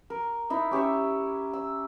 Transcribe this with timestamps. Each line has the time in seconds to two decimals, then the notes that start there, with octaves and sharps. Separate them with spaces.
0.10 A#4
0.50 D#4 E4 D#5
0.71 C#4 G4 C#5 E5
1.53 E6